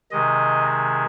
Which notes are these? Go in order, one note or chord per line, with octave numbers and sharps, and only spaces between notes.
C3 D#3 G#3 D#5